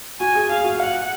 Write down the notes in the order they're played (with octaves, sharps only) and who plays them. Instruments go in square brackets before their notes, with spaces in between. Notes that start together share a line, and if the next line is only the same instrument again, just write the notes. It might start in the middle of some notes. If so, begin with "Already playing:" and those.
[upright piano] F#4 [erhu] G#5
[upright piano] G#4
[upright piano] G#4 [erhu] F5
[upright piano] F#4
[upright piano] F5 [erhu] F#5